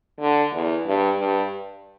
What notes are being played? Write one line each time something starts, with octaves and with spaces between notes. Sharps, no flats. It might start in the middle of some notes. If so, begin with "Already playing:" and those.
D3
E2
G2
G2